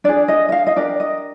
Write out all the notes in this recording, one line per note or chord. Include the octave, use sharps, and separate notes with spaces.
D4 G#4 D5
D#5
D#5
F5
D#5
D4 G4 A#4 D5
D#5